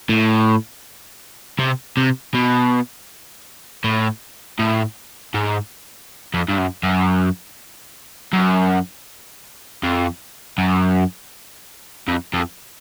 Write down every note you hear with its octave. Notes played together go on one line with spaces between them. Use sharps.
A2
C3
C3
B2
A2
A2
G#2
F2
G2
F#2
F#2
F#2
F2
F#2
F2
F2